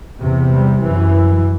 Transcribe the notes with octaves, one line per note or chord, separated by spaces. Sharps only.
E2 C3
G3
F#2 E3